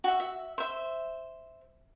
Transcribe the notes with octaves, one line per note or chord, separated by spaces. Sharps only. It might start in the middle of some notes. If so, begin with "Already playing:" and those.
F#4 E5
E5
C5 E5